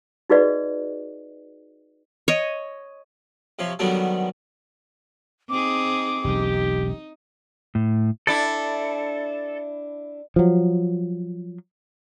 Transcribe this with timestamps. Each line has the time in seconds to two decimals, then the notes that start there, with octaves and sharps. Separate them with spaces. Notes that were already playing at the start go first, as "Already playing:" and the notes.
0.30 D#4 F#4 G#4 B4 D5 D#5
2.28 C#5 D#5
3.59 C3 F3 C#5
3.79 D3 D#3 F#3 G3 B3 D4
5.49 C4 D#4 G#4 D6
6.24 E1 B1 D#4 G4
7.75 A2
8.27 D4 E4 A4 D5
10.36 F3 F#3